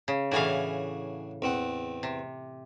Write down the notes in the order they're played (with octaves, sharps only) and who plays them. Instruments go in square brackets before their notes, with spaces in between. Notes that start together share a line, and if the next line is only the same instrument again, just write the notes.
[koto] C#3
[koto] A2 E3 F5 [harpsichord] D4 F#4 G#4
[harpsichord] E2 C4 F#5
[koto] C3